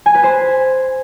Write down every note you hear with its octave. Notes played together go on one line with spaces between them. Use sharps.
G#5
B4
C5